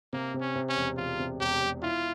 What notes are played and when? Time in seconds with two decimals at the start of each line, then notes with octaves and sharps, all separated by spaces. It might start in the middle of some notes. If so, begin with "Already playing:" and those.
0.13 C3 A#3
0.34 C3
0.41 C#4
0.56 C3
0.69 C#4
0.76 E1
0.97 E1 F4
1.19 C3
1.40 E1 G4
1.61 E1
1.82 E4 F4